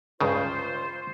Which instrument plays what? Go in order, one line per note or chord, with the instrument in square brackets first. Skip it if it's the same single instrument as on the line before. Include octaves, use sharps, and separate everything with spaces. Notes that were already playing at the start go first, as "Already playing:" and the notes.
[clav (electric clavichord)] C#2 G2 C#3 [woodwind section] F4 C5